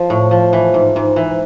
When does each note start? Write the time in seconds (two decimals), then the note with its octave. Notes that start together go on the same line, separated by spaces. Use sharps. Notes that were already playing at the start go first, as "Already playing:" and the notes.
Already playing: F3
0.10 A2
0.31 F3
0.53 E3
0.74 G#2
0.96 G#2
1.16 E3